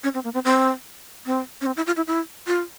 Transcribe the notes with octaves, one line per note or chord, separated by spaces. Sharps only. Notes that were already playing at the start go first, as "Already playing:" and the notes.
C#4
C4
A#3
C4
C4
C4
C#4
C4
E4
F4
E4
E4
F4